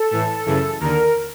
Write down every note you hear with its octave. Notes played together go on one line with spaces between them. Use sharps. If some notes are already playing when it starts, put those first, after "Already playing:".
Already playing: A4
A2 E3
F#2 C#3 E3
D#2 D3 A#4